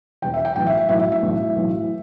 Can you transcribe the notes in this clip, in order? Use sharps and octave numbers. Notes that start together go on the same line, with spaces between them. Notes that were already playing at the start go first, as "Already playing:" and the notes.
E1 E2 E3 G5
E5
G5
B1 A2 E3 G5
E5
E5
B1 A2 E3 E5
E5
E5
B1 A2 E3
B1 A2 E3